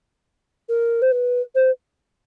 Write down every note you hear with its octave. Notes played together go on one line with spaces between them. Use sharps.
A#4
C5
B4
C5